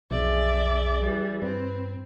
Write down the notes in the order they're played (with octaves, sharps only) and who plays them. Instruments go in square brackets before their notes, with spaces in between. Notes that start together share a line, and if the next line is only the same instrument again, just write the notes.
[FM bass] B1 [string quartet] F2 D5 E5 [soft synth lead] G#4
[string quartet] E3 G3
[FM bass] G2 [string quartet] C4 [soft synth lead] B4